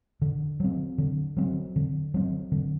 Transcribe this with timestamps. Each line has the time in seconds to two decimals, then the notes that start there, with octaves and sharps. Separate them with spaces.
0.22 D3
0.60 F#3 C4
0.98 D3
1.37 F#3 C4
1.76 D3
2.14 F#3 C4
2.52 D3